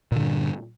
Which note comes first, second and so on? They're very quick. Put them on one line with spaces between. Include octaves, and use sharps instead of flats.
A#2 D3 G2